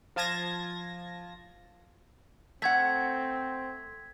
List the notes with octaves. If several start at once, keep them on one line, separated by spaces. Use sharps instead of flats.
F3 F4 A5 G#6 A#6
A3 C4 F#5 G#6 B6